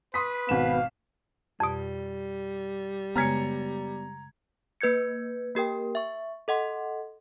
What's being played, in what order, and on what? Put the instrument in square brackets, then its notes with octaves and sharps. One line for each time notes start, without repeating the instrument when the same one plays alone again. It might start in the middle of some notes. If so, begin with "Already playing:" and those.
[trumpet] B4 [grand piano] C6 D#6 B6
[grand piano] G#1 B2 E7 [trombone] B3 [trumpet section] F5
[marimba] F2 B2 [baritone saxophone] G3
[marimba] F#2 C#3 G#3 [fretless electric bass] B3 [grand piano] A#5 G#6 C#7
[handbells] A#3 B4 G6 G#6 C#7
A#3 G4 A#4 G5
E5 C#6
A4 D#5 F#5 C6